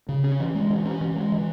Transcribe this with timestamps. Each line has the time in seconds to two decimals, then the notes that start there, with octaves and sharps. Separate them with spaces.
0.09 C#3
0.24 C#4
0.40 E3
0.55 G#3
0.70 E3
0.85 C#4
1.01 E3
1.16 G#3
1.32 E3